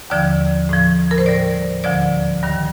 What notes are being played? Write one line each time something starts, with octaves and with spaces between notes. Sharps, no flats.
D#2 D3 F3 D5
A2 F3
A#4
C5
A2 G3 D5
D2 D3 F3 D5
G2 D#3 G3